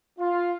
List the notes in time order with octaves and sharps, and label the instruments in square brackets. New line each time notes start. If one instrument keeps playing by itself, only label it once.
[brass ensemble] F4